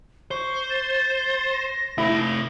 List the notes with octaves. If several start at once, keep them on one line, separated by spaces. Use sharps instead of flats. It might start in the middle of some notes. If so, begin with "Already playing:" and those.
C5 C#6
A6
A#6
C3 A3 E4